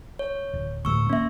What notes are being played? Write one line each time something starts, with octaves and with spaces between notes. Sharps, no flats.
C#5
D1
D2 A2 C#6 E6
A#3 C#4 E5